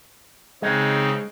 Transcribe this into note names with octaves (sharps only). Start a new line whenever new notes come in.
C#3 G#3 C4 D#4